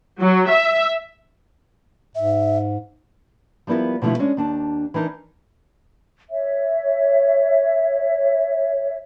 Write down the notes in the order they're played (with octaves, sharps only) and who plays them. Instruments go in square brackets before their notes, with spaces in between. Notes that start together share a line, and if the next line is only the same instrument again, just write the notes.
[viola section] F#3
E5
[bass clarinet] G#2 [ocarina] E5
[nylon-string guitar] F3 G3 B3 E4 A#4
B2 D3 F3 A3 E4
G#3 C#4 D4
D#2 D4 A5
E3 D4 D#4 A#4
[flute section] C#5 E5